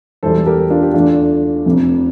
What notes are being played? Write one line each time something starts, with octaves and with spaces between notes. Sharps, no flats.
E1 E2 E3 G3 A4 C5
G4 A#4
D4 F4
G4
E2 D3 A3 D4 F4
F1 F2 C3